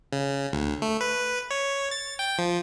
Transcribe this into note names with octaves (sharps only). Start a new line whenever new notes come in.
C#3
D2
A3
B4
C#5
A6
G5
F3